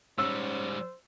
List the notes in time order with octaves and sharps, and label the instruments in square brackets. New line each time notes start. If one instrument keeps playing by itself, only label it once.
[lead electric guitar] G#2 G3 [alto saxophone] C#4 [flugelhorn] C5 [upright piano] E6